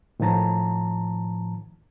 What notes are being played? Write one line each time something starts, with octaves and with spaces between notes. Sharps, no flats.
A2 D#3 F3 A5 A#5